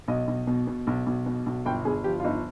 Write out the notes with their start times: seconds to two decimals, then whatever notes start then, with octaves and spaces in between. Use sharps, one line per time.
0.08 B1 D#5
0.27 B1
0.47 B2
0.67 B2
0.87 B1
1.06 B1
1.26 B2
1.46 B1
1.66 G1 G5
1.85 G1 G#4
2.04 F3 G4
2.20 F4
2.24 G1 D#4